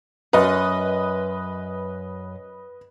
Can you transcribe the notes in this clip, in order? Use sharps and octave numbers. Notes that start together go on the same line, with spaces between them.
F#2 B4 D#5